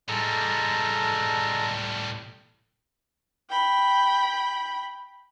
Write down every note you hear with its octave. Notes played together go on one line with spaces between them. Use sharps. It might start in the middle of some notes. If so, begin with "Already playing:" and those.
A2 G3 G#3 A4 A#5
G5 B5